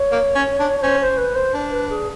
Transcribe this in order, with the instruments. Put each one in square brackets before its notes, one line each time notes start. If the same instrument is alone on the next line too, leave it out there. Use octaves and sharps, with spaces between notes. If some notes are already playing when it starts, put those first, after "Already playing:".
Already playing: [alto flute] C#5
[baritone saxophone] A#3
C#4
D4
[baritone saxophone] C#4 [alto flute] C5
[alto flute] C5
B4
C5
[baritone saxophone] D4
[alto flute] B4
G#4